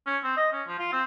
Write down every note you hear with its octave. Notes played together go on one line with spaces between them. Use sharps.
C#4
C4
D#5
C#4
F3
F4
C4